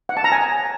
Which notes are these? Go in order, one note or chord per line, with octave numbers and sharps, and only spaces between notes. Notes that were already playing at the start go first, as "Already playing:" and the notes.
F#5
A5
A#5
G#5